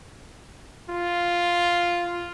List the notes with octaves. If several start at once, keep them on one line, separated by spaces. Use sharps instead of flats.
F4